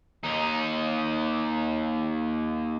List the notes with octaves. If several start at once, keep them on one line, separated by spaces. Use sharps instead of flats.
D#2 D#4